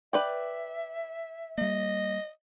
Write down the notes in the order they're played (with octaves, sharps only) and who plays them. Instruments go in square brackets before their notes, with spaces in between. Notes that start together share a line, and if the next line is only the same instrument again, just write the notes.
[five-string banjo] B4 D5 G5 [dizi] E5
[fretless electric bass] G3 A#3 [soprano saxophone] D#5